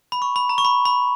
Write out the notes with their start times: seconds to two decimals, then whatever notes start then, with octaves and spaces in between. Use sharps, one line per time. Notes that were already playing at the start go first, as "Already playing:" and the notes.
0.12 B5
0.22 C#6
0.36 B5
0.49 A#5
0.58 C#6
0.65 B5
0.85 B5